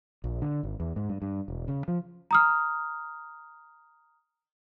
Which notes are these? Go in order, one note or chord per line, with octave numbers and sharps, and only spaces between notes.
A#1
D3
G#1
E2
G#2
G2
G2
E1
C#3
F3
A#5 D#6 F6